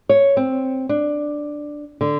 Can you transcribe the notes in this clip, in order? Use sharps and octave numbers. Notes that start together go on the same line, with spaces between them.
C#5
C4
D4
D3